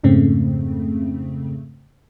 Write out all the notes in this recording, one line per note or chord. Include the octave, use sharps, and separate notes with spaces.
F2 G#2 C#3 A3 C4